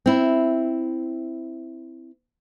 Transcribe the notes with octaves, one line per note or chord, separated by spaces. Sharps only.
C4 E4